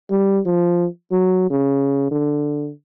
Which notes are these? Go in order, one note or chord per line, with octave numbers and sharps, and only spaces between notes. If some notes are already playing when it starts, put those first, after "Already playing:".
G3
F3
F#3
C#3
D3